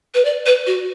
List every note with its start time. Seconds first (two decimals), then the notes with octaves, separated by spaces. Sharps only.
0.15 B4
0.25 D5
0.46 B4
0.67 F#4